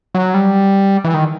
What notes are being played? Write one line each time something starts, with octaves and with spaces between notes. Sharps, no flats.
F#3
G3
E3
D#3